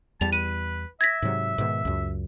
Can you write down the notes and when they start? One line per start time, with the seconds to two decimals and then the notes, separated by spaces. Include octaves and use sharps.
0.21 E2 G3 A5 F7
0.33 B4 D#7
1.01 E5 G#6 A#6 B6
1.22 G#2 C3 F#3
1.58 G#2 B2 D#3
1.85 C#2 F#2